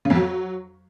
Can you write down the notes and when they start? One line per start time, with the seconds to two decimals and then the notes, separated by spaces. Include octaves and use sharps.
0.05 C#3
0.10 F2
0.15 F#3